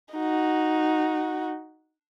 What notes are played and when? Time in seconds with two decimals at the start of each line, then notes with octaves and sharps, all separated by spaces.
0.14 D#4 F#4